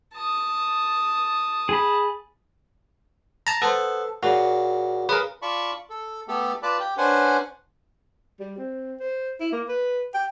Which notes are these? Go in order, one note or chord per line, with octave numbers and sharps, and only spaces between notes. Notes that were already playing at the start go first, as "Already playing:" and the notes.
A5 D#6
G#4 B5
A5 A#5
B3 A4 C5
A#2 C#3 F#4
C#3 A#4 B4 D#6
F4 D5 A5 B5 C#6
A4
A3 B3 G4 A4
F4 B4 D5 A5 B5 D6
G4 G5
C#4 D4 B4 C5 F#5 G#5
G3
C4
C5
E4
A#3
B4
G5